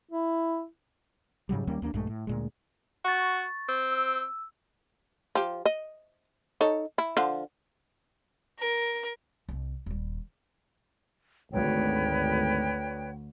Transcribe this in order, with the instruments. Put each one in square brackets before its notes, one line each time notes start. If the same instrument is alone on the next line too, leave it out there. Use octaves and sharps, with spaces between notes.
[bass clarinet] E4
[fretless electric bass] G#2 C#3 F#3 G3
D#2 G3 A#3 C#4
D#2 A#3 B3 D4
A#1 G2 G#3 A3
A2
D2 A#2 G#3
[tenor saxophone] F#4 [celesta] C#6 A6
[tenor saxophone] C4
[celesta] E6
[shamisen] F3 G4
D#5
D#4 A4 C#5
E4
D3 F3
[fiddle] A#4
[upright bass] C2 C4
D#1 G3
[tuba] G#1 [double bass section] D2 [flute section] B4 C#5 G5